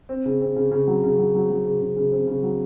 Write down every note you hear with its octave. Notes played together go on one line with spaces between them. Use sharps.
C4
C#3
C4
C#3
C#3
F#3
C#3
F#3
F#3
F#3
C#3
C#3
C#3
C4
C#3
F#3